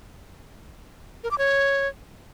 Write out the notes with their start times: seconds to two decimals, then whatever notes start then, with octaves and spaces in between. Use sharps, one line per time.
1.24 A#4
1.31 D6
1.38 C#5